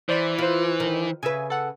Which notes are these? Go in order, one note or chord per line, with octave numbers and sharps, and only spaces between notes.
E3 C5 D5 B5
F4 B4 C5
D#3
C#3 B4 E5 G#5
A4 F#5